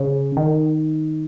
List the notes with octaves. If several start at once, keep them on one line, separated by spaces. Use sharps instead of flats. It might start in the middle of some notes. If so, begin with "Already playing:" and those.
Already playing: C#3
D#3